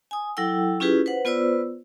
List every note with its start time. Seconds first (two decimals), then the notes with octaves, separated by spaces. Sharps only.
0.11 G#5 D#6
0.37 F#3 E4 A4 F#5 G5 E6
0.80 C#4 E4 F4 G4 G#4 B4
1.06 B4 C5 F#5
1.25 B3 F4 B4 C5 D5 E6